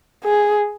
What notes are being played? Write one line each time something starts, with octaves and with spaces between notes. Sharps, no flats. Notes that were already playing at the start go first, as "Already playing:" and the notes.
G#4